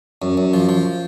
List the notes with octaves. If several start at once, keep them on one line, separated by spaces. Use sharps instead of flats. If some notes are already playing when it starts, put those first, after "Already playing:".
F#2
F#2
F3
F3